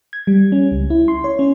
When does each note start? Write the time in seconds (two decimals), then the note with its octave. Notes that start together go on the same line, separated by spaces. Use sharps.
0.13 G#6
0.27 G3
0.52 C#4
0.72 C#2
0.90 E4
1.08 C6
1.24 C#5
1.39 C#4